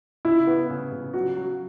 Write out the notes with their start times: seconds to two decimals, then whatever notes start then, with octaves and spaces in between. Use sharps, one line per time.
0.25 C#3 E4
0.47 B3
0.70 C#3
0.92 C#3
1.14 F#3 F#4
1.36 F#3